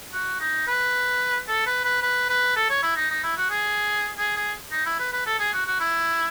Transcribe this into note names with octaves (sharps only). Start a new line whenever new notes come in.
F#4
D#4
B4
A4
B4
B4
B4
B4
A4
C#5
E4
D#4
D#4
E4
F#4
G#4
G#4
G#4
D#4
E4
B4
B4
A4
G#4
F#4
F#4
E4